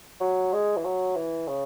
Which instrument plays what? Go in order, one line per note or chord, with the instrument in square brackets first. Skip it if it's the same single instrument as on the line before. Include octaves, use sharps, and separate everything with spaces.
[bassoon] F#3
G#3
E3
F#3
E3
C#3